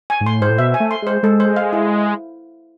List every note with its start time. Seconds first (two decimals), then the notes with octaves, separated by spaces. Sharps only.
0.10 G#5
0.21 G#2
0.25 A2 C6
0.41 G#2 C5
0.50 A2
0.58 B2 E5
0.74 G#5
0.80 A3
0.91 C6
1.02 G#3 C5
1.23 G#3 A4
1.40 C5
1.56 F5
1.73 E4